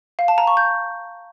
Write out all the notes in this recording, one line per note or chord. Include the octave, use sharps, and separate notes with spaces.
F5
A5
A#5
C#6
G6